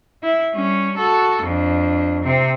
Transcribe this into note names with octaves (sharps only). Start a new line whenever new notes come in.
E4
G3 C#4
F#4 A4
F2 D4
C3 C4